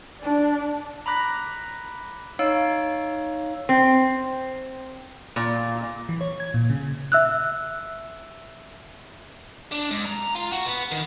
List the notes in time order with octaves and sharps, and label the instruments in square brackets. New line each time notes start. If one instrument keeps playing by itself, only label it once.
[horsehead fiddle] D4 D5
[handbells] A#5 B5 D6 F#6 A#6 B6
D#4 C#5 F5 E6 D7
[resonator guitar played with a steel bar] C4
A#2
[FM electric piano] E3
C#5
G#6
A#2
C#3
[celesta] E5 E6 F#6
[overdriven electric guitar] D4
G#2
A#5
F4
F#4
B3
D#3